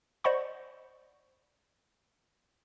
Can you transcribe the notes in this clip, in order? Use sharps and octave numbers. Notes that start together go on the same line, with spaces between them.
C5 D5 D#5 F#5 B5 C#6